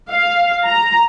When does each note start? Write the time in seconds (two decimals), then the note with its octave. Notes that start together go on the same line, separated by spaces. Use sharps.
0.12 F5
0.66 A#5